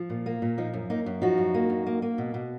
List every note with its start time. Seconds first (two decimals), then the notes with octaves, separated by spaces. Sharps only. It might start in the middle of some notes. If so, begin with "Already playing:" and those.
Already playing: F3
0.10 A#2
0.26 A#3
0.42 A#2
0.58 F3 D#4
0.73 F#2
0.90 A#3 D#4
1.06 F#2
1.22 F3 D#4 F#4
1.38 F#2
1.54 A#3
1.70 F#2
1.86 A#3
2.02 A#3
2.18 B2
2.34 B2